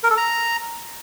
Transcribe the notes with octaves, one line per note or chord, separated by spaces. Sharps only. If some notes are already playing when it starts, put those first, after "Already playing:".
A#4
A4
A#5